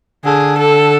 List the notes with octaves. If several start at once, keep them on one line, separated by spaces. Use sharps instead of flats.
D3 G#4
A4